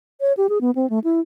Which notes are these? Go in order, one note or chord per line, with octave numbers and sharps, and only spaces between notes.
C#5
G4
G#4
B3
C4
A3
E4